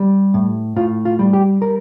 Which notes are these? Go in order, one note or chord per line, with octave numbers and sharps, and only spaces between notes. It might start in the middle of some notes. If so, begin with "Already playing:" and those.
Already playing: G3
A2
A2 F4
F4
G3
G4
G3 A#4